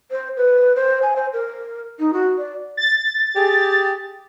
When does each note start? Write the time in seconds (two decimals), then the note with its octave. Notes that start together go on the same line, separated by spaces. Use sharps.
0.11 C5
0.37 B4
0.76 C5
1.02 G#5
1.16 C5
1.33 A#4
1.99 D#4
2.13 F#4
2.38 D5
2.77 A6
3.36 G4 G#4